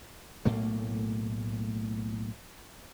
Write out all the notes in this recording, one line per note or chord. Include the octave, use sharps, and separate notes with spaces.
B1 A2 A3 A#3